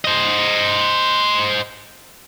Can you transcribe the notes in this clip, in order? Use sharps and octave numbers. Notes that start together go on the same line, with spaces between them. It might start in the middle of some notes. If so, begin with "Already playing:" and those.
C5 D#5